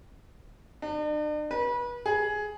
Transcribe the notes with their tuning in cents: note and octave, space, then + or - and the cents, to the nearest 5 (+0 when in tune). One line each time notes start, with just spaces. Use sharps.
D4 +45
B4 -30
G#4 +10